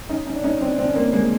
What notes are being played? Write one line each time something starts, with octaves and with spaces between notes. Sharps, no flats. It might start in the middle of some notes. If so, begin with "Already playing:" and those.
C#4 D#4
C#4 D#4
D4
C#4 D#4
C4 D4
C4 D4
C#4
A#3 C4
G#3 A#3